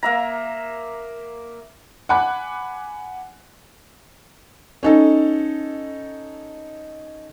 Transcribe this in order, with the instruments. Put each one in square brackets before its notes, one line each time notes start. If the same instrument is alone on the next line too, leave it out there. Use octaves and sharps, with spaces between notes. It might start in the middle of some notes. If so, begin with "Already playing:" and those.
[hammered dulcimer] A#3 E5 A#5
[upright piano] F#5 G#5 B5 D6 F#6
[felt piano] C#4 D#4 A4